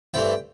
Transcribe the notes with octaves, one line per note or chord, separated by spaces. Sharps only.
G2 E3 A3 C4 E4 G5